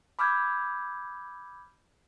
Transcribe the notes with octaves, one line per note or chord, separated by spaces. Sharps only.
B5 D6 E6 F6 G6 G#6